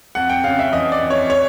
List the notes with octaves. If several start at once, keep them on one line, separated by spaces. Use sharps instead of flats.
F2 F#5
G5
C#3 F5
E5
E3 D#5
D5
F2
C#5
C#5